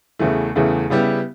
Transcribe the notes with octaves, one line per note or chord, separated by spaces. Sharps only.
E2 C#3 E3 A3
E2 C#3 E3 A3
C#3 G3 B3 E4 G4